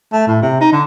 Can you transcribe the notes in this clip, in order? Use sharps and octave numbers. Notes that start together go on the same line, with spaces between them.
A3
A2
C3
D#4
D3